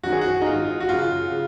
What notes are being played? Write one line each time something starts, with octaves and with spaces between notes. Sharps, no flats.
F#2 D#3 F#4
G#4
F#4
D#4
G#2 D#3 F4
F#4
F#2 C#3 F4
C#3